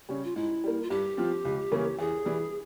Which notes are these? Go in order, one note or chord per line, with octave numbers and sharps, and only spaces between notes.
C#3 G3 C#4
F4
G#2 E4
G3 A#3
F4
G2 G4
F3 C4 F4
C#2
C#3 E3 A#3 C#4
E2 G#4
E3 G3